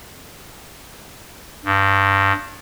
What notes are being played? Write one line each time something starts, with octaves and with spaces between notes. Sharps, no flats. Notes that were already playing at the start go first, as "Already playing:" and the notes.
G2